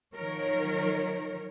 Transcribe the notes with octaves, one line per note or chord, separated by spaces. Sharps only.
D#3 F3 F#3 A#4 C#5